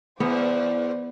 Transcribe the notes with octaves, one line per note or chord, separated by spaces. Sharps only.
E2 B3 C5 D5